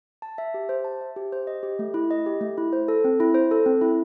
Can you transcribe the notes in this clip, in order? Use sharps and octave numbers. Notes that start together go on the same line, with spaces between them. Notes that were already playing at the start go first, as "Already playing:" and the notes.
A5
E5
G4
C5
A5
E5
G4
C5
D#5
G4
A3
E4
D#5
G4
A3
E4
C5
A4
C4
E4
C5
A4
C4
E4